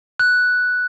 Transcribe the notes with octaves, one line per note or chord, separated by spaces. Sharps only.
F#6